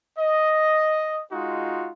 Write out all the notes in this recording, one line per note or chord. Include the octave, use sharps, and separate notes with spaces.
D#5
G#3 D#4 F4 F#4